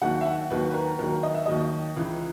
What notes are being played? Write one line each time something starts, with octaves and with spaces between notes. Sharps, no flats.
D#2 D#3 F#3 F#5
E5
F#5
D#2 D#3 F#3 B4
B4
A#4
D#2 D#3 F#3 A#4
D#5
E5
D#2 D#3 F#3 D#5
C#2 C#3 E3